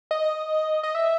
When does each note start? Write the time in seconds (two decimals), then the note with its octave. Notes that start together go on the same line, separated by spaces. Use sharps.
0.11 D#5
0.83 D#5
0.95 E5